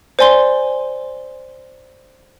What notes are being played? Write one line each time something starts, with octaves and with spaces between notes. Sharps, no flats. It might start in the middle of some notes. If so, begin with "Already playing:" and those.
C5 D5 G#5 C6 G7